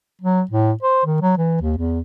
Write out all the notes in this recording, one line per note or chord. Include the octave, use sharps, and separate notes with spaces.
F#3
A2
C5
D#3
F#3
E3
D#2
E2